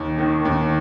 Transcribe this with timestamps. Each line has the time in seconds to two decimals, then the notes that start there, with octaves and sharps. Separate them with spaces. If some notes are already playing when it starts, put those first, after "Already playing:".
Already playing: D#2
0.18 D#3
0.45 D#2